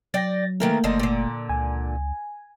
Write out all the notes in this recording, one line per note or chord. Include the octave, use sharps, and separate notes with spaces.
F#3 D5 G5 A6 A#6
D#3 E3 A3 A#3 A#4
F#1 D3 F3 D#4
A#2 D3
C#2 G#5